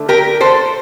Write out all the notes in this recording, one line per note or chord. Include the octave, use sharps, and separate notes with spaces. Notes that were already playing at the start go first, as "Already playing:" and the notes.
Already playing: D3 A3
G4 A#4
A4 C5